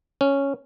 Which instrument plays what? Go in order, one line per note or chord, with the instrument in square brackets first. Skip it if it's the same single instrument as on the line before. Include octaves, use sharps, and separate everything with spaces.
[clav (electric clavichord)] C#4